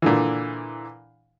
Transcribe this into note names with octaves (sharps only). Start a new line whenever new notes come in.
A#2 D3 E3